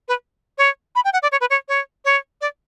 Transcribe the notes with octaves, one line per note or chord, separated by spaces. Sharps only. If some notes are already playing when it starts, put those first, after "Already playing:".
B4
C#5
B5
G5
F#5
D5
C#5
B4
C#5
C#5
C#5
D5